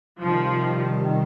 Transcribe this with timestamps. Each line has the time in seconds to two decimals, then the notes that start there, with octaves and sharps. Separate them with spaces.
0.21 C3 D#3 F3 G3